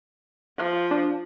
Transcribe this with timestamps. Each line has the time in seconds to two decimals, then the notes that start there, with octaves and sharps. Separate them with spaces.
0.57 F3
0.91 D4